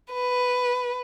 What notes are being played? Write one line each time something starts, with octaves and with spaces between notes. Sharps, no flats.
B4